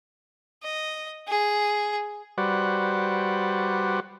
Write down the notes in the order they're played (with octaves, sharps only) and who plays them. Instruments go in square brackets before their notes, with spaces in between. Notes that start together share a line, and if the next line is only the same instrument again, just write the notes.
[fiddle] D#5
G#4
[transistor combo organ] G3 F#4 B4 C5 D5 F#5